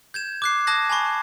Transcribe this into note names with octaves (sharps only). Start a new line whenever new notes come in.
G6 G#6 E7
D6 F#6 C7
A5 D#6 F#6 G#6 A#6
G#5 A5 B5 C#6